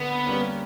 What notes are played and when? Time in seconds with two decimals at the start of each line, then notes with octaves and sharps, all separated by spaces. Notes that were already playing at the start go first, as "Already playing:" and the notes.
Already playing: D3 B3
0.26 G3 A#3 C#4